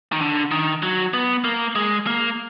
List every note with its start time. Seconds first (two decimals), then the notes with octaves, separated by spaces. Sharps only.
0.12 D#3
0.21 D3
0.51 D#3
0.83 F#3
1.14 B3
1.44 A#3
1.75 G#3
2.07 A#3